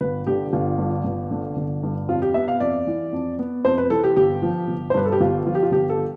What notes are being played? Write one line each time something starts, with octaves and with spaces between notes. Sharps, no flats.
G1 B4
D3 G4
G1 F4
G2
G1
D3
G1
G2
F2 F4
G4
B3 E5
F5
F2 D5
E3
F2
B3
F2 C5
B4
E3 A4
G4
G1 G4
F3
G1
C5
G2 B4
A4
G4
G1 F4
F3 F4
G4
F4
G1 G4
A4